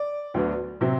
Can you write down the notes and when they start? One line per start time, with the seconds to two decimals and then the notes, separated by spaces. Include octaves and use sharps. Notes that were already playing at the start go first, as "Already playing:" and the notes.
Already playing: D5
0.34 D2 D3 F#3 B3 D4
0.81 C3 F#3 C4